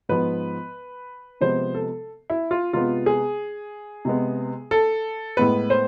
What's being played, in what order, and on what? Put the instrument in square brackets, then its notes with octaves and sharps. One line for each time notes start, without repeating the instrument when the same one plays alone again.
[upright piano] G#2 F3 B3 B4
C3 F3 G#3 B3 C5
A4
E4
F4
C3 G#3 B3 F4
G#4
C3 G#3 B3
A4
A2 G#3 B3 B4
C5